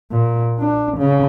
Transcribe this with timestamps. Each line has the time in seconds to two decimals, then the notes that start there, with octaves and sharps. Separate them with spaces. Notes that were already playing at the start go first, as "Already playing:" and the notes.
0.12 A#2
0.60 D4
0.98 C#3